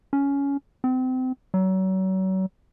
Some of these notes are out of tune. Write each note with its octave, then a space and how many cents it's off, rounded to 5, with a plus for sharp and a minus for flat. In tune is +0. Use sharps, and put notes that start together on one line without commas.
C#4 +15
C4 -30
F#3 +35